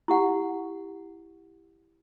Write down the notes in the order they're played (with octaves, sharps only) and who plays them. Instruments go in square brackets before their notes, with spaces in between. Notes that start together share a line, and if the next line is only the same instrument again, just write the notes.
[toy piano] E4 G4 F#5